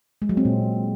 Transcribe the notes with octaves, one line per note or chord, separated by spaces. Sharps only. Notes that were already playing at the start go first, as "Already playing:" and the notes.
G#3
F#3
C4
A#2